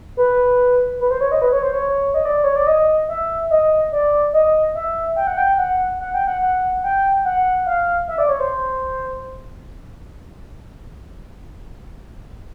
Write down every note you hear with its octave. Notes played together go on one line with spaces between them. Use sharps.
B4
B4
C5
C#5
D#5
B4
C#5
C5
C#5
D#5
D5
C#5
D5
D#5
E5
D#5
D5
D#5
E5
G5
F#5
G5
F#5
F#5
G5
F#5
F#5
G5
F#5
F5
E5
D5
C#5
C5